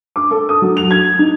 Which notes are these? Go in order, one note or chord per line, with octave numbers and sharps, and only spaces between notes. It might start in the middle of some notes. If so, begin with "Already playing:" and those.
D6
A4
D#6
F#3
F7
G#6
D#4